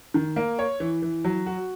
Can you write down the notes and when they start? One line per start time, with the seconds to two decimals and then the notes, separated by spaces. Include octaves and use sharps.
0.14 D#3
0.36 A#3
0.59 C#5
0.80 E3
1.02 E3
1.24 F#3
1.46 F#4